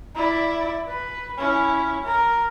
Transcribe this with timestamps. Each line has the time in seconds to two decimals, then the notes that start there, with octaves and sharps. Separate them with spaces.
0.15 E4 D5
0.87 B4
1.38 C#4 E4
2.04 A#4